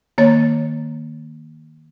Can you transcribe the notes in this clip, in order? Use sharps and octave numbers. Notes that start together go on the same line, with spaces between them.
D#3 A#3 C#5 A6